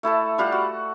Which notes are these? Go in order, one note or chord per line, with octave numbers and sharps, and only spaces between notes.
A3 E4 A4 A5
G3 F4 G4 F#5
F#4